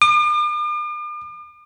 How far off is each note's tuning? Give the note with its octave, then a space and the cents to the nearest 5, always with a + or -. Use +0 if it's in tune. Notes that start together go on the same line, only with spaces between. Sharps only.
D6 +45